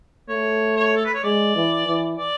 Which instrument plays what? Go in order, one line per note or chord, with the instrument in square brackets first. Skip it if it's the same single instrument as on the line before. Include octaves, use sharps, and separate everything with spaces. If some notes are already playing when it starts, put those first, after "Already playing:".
[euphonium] A3 [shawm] C#5
[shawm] C#5
A4
B4
C#5
[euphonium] G#3 [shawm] D5
[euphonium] E3
E3
[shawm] D5